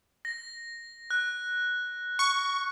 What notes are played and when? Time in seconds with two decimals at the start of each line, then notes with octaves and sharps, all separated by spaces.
0.25 A#6
1.11 F#6
2.19 C#6